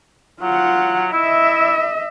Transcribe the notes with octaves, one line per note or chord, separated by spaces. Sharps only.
F#3 F4 F#5
E4 D#5 E5